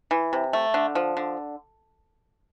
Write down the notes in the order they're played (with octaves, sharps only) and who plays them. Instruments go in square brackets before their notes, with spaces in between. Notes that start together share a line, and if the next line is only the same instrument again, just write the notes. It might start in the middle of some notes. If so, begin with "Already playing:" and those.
[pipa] E3
C3
A3
D3
F3
D3